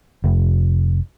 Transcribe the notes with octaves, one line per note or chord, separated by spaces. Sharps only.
F1